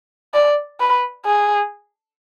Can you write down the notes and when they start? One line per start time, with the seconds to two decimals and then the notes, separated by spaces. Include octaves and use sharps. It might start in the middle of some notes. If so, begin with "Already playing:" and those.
0.34 D5
0.80 B4
1.25 G#4